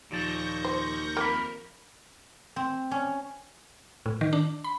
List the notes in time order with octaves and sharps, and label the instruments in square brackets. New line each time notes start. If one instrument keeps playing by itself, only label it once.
[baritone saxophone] D#2 [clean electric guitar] A#2 F3 A5 [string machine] C#6 G6 A#6
[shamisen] C5
[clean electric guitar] F2 B5 [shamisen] A#3 [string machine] A#4
[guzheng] C4
C#4
[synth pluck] A2
D#3
D4
B5